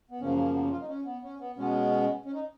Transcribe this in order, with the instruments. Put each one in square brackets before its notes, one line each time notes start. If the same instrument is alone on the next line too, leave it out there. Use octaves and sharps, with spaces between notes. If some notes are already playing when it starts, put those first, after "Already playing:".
[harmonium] B3
F#2 C#3 F3 A#3 C#4
C#4
B3
C#4
F4
D#4
C#4
B3
C#4
B3
B2 G#3 B3 C#4
C#4
D#4